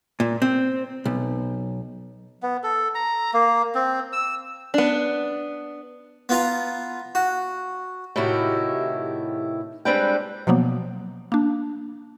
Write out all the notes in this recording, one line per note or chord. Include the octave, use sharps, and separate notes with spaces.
A#2
C4
B1
B3
A4
A#5
A#3
C4
E6
B3 D4
B3 F4 A#5
F#4
A2 C3 D#3 E4 F#4 G4
G3 G#3 C4 D4 B4 G5
B2 F3 F#3 A#3 B3
A#3 D4